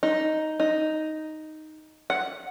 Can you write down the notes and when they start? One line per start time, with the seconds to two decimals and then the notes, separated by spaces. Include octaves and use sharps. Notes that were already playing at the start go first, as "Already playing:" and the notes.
0.03 D#4
0.60 D#4
2.10 F#5